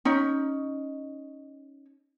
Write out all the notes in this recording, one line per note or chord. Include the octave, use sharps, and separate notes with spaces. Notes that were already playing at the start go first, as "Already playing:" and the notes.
C#4 D#4